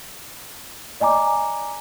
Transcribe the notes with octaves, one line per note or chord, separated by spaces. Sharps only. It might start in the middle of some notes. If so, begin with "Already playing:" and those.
D5 D#5 G#5 A#5 D6